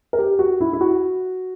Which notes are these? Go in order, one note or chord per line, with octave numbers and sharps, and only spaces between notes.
A#4
G4
F#4
E4
E4
F#4